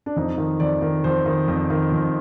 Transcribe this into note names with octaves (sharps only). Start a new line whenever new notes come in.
D4
F2 D#4
D#3
F2 D5
D#3
F2 C5
D#3
F2
D#3
F2